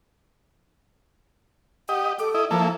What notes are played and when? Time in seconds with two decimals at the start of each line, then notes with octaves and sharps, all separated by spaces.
1.89 G4 D#5 F#5
2.19 A4 D6
2.35 E4 D#5
2.51 F3 A#3 E4 A4